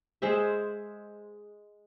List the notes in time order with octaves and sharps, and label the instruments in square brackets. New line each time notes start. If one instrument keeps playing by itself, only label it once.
[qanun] G#3 G#4 C5 E5